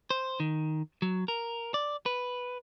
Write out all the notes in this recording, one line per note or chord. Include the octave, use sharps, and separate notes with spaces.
C5
D#3
F#3
A#4
D5
B4